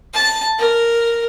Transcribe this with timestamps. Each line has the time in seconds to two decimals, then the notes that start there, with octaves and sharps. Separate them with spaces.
0.14 A5
0.59 A#4